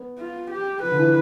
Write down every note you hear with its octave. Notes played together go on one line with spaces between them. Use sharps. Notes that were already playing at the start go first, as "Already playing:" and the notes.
Already playing: B3
F4
G4
F3 B4
D3
E3